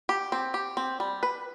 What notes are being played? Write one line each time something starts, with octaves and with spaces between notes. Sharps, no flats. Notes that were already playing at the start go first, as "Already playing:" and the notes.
G4
C4
G4
C4
G3
B4